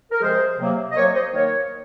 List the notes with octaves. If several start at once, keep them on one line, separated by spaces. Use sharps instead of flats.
A#4
C3 F3 G#3 G#4 C5
C3 F#3 A#3
D#5
C3 F#3 A#3 A#4 C#5
C5 D#5
D#3 F#3 A#3 A#4 C#5